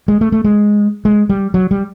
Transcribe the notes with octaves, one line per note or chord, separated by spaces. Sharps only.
G#3
A3
A3
G#3
G#3
G3
F#3
G3